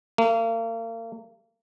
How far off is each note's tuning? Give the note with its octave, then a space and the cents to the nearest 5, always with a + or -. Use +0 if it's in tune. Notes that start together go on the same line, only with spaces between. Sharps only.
A#3 -40